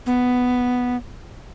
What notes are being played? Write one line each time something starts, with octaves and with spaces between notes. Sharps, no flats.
B3